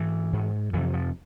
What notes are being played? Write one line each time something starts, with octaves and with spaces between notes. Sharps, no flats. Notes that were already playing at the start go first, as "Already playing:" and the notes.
Already playing: G#2 E3
G#2
F2 C3 E3
F3